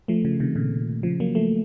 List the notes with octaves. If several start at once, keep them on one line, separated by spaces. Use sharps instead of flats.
F3 A3
C#3 F3
C3 D#3
A#2 C#3
C#3 F3
F#3 A#3
F3 A3